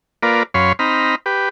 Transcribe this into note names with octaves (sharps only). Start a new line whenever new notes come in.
A#3 F4 A#4 B4 D5
F#2 C#4 C#5 F5 B5 C6
C4 D#4 A#5 B5 F6
G4 B4